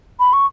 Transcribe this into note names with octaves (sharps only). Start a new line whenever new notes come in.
B5
C#6